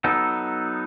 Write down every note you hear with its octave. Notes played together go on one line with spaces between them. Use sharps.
F#3 B3 D#4 A4